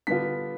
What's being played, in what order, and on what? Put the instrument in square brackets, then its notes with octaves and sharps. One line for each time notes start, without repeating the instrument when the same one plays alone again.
[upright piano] D3 G3 B3 D4 F4 B6